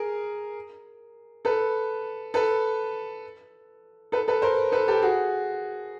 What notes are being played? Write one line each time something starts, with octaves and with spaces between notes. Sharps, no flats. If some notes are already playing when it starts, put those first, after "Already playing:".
Already playing: G#4 A#4
A4 B4
A4 B4
A4 B4
A4 B4
A#4 C5
A4 B4
G4 A4
F#4 G#4